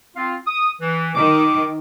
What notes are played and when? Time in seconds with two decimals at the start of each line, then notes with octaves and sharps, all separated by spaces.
0.17 C4 F4 F5
0.47 D#6
0.82 E3
1.16 D#3 D6